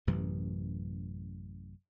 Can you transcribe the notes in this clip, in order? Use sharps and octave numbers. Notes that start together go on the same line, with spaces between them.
A1 F#2 C3 E3